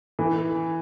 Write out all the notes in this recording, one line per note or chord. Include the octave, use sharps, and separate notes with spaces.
E3